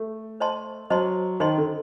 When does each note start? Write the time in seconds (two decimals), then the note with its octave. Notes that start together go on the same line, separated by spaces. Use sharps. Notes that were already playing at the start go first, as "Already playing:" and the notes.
Already playing: A3
0.40 C5 D#5 A5 C6
0.90 F#3 C5 D#5 A5 C6
1.40 D#3 C5 D#5 A5 C6
1.58 D3